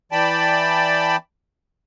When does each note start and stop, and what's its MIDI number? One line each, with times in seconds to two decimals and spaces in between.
0.12 1.16 52
0.12 1.16 74
0.12 1.16 79
0.12 1.16 81
0.12 1.16 83